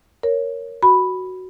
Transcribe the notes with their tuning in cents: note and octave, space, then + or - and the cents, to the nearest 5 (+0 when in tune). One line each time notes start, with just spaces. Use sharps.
A#4 +0 C#5 +0
F#4 +0 B5 +0